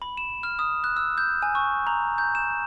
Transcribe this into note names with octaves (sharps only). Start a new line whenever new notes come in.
B5
E7
F6
D#6
F#6
E6
G6
G#5
C#6
A#5
G6
E7